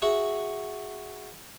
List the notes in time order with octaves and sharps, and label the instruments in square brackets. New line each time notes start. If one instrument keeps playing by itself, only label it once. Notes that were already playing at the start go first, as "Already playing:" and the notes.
[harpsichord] F#4 G#4 E5 F#5